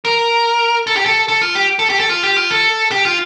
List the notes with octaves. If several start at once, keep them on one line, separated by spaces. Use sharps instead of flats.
A#4
A4
G4
A4
A4
F4
G4
A4
G4
A4
F4
G4
F4
A4
G4
F4